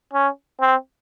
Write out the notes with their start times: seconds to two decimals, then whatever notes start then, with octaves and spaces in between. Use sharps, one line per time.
0.13 C#4
0.61 C4